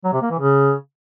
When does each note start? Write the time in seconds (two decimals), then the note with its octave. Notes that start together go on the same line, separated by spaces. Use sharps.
0.04 F#3
0.13 C3
0.22 A#3
0.31 E3
0.39 C#3